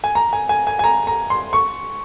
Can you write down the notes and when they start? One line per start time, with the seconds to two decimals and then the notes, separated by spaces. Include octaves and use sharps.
0.04 G#5
0.15 A#5
0.33 G#5
0.49 G#5
0.67 G#5
0.79 G#5
0.84 A#5
1.07 A#5
1.30 C6
1.53 C#6